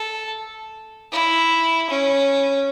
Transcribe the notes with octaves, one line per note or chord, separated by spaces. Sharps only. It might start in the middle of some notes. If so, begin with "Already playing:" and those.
Already playing: A4
E4
C#4